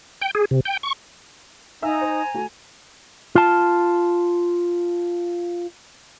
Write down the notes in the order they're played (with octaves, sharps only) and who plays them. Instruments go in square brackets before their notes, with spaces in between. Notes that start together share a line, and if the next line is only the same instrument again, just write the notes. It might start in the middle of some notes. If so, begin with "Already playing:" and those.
[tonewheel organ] G5
G#4
C3
G5
C#6
[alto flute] D#4 [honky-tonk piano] E5 F5 E6 [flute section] G#5 A#5
[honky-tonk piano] C5
A3 F#4
[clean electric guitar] F4 A5